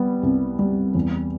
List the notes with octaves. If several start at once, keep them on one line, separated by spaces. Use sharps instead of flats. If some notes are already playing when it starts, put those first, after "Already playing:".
Already playing: G3 B3
C2
G3
E2